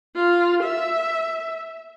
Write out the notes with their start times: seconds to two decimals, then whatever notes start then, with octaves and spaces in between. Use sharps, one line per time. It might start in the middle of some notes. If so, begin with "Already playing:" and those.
0.16 F4
0.64 E5